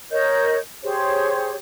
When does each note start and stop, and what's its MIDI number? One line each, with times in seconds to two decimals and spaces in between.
0.12 0.57 70
0.12 0.57 73
0.12 0.57 75
0.12 0.57 91
0.84 1.55 67
0.84 1.55 68
0.84 1.55 72
0.84 1.55 73